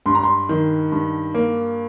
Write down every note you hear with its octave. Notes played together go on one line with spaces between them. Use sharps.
G2 C6
A#5
C6
D#3
G2
A#3